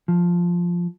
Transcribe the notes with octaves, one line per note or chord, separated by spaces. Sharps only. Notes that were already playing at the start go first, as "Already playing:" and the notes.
F3